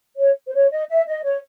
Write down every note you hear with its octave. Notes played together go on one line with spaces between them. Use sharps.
C#5
C5
C#5
D#5
E5
D#5
C#5